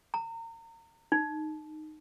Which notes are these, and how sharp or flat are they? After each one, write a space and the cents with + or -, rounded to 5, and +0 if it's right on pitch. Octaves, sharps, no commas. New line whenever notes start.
A#5 -35
D#4 -15